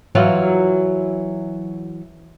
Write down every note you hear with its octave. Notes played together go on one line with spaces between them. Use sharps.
E3 F#3 F4